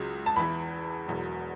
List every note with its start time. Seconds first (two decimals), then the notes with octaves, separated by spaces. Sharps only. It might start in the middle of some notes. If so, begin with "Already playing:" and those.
Already playing: C#2 C#3 F#3
0.26 A5
0.36 E2 E3 B5
1.07 E1 E2 B2 F#3